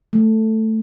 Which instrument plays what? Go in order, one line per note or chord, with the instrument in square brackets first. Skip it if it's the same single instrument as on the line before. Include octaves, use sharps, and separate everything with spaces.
[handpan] A3